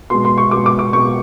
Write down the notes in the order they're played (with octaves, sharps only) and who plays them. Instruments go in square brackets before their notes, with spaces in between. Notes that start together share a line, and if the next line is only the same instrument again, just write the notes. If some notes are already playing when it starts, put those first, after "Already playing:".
[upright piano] B2 G#3 C6
C6
C#6
B2 G#3 D6
D6
D6
B2 G#3 C#6